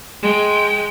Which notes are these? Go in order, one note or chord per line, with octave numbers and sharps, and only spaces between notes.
G#3 G5